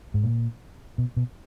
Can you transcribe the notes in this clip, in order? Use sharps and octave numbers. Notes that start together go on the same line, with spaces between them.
G#2
A#2
B2
B2